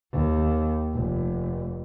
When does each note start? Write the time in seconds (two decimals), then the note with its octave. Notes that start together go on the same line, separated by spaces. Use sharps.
0.13 D#2
0.95 F1